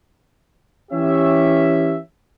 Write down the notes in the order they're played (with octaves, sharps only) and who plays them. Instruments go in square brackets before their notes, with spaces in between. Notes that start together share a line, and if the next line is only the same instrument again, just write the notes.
[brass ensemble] E3 C#4 G4 E5